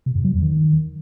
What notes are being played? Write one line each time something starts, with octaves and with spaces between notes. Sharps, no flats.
C3
F#2
F#3
E2
D#3